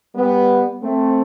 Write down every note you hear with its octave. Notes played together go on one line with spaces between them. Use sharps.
G3 B3
A3 C4